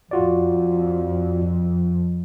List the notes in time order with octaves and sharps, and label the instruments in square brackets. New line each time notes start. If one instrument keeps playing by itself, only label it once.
[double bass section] F2 [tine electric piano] F4 F#4 D5